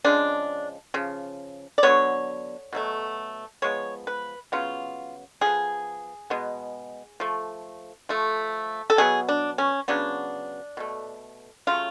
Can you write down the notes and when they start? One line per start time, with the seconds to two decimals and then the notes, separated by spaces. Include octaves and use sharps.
0.04 C#3 F3 G#3 D4
0.94 C#3 F3
1.78 D5
1.83 D3 F#3 B3 C#5
2.73 B2 F#3 A3
3.62 F3 G#3 B3 C#5
4.07 B4
4.52 C#3 F#3 B3 F4
5.41 F3 B3 G#4
6.30 B2 G#3 B3
7.20 F3 A3
8.09 F3 A3
8.90 A4
8.98 B2 F#3 B3 G#4
9.29 D4
9.58 C#4
9.88 C#3 F#3 B3 D4
10.77 B2 A3
11.67 C#3 F#3 A3 F4